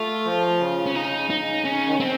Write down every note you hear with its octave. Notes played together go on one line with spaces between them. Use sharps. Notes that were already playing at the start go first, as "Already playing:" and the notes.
Already playing: A3 F4
F3
C#3
C#4
C#3 D#4
C#3
D#4
C#3
C#3 C#4
D#3
C#3
C4